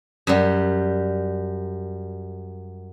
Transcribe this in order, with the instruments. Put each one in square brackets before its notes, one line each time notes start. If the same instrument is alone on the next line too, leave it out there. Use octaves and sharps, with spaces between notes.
[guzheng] F#2 G3